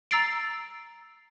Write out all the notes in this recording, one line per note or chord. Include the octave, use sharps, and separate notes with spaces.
A#5 E6 A6 C7 D7